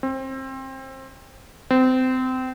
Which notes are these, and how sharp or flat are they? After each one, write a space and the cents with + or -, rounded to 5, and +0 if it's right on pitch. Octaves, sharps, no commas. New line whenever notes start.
C4 +25
C4 -25